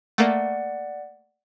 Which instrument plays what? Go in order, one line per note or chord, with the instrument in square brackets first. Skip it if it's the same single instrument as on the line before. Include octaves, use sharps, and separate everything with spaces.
[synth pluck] A3 A#3 [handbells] D5 F#5